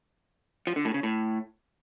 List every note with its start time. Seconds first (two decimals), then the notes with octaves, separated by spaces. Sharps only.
0.67 F3
0.76 D3
0.85 A2
0.94 C#3
1.03 A2